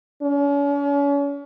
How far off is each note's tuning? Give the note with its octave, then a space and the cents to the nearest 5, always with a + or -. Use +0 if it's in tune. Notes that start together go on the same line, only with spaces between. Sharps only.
C#4 +40